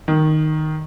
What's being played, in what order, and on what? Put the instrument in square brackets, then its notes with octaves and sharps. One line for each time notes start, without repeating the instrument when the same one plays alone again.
[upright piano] D#3